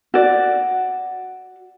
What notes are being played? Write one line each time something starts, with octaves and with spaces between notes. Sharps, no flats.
F#4 D5